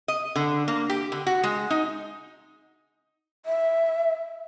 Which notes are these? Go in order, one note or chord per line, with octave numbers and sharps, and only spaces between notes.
D#5
D3
A#3
G4
D3
F#4
G#3
D#4
E5